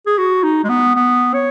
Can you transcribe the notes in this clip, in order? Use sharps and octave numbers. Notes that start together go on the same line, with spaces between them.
G#4
F#4
D#4
G#3
B3
B3
C#5